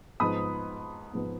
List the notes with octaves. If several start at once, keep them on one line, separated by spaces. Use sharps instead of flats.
G#2 F3 B3 B5 D#6
G#2 F3 B3